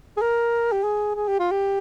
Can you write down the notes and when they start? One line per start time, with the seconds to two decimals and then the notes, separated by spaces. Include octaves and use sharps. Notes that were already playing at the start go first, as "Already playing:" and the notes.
0.17 G#4
0.22 A#4
0.72 G4
0.84 G#4
1.15 G#4
1.28 G4
1.39 F4
1.51 G4